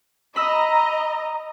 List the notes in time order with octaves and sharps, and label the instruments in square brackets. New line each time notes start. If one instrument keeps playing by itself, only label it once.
[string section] D#5 A#5 [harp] B5 E6